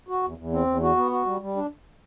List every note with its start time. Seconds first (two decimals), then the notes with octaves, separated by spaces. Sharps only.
0.08 F#4
0.23 E2
0.38 E2
0.53 C4
0.67 E2
0.83 F#4
0.97 B3
1.11 F#4
1.26 G3
1.41 G3
1.56 D4